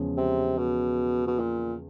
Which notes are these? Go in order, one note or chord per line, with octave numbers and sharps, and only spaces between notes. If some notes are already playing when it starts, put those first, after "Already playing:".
Already playing: E2 C#3 F3 G#3 C#4
C3
B2
B2
A#2